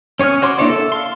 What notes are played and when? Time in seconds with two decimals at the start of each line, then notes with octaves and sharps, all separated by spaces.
0.19 C#4 C#5 G#5 D#6 F6
0.42 F#4 C#5 C6 D6
0.58 A#3 D4 E4 C#5 D5
0.70 A4 E5
0.92 F5 C6